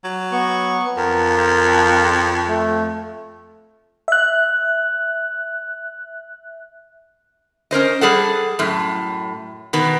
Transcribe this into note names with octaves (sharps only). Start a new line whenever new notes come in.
F#3
B3 C#6
F2 A#4
A3
E5 F#6
C#4 A#4 C5 D#5
G3 G#4 A4 F#5
F#2 A2
B2 D#3 B3